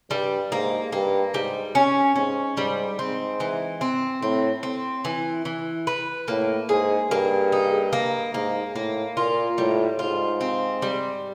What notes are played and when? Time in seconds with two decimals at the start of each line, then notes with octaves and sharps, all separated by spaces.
0.10 G2 G3
0.51 G#2 A#3
0.93 G2 A#3
1.34 G#2 G3
1.75 C#4
2.16 G#2 C#4
2.57 G#2 G3
2.99 G#2 C4
3.40 E3
3.81 C4
4.22 A2 C4
4.63 C4
5.05 E3
5.45 E3
5.87 B4
6.28 A2 A#3
6.69 G#2 G#4
7.11 G2 A#3
7.52 D#4
7.93 A#3
8.34 G#2 A#3
8.75 A2 A#3
9.17 A#2 F4
9.58 A2 G3
9.99 G#2 F4
10.41 C4
10.82 G3